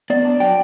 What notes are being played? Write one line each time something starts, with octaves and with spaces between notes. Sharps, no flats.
B3 D5
D4
F#3 G5